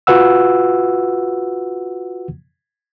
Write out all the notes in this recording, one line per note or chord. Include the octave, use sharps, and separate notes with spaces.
F4 F#4 B4 F#5 E6